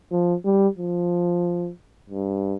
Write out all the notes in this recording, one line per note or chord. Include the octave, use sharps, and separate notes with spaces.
F3
G3
F3
G2